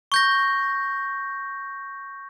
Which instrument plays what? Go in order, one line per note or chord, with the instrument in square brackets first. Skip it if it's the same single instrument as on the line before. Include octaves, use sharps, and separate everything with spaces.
[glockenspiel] C#6 G6 A#6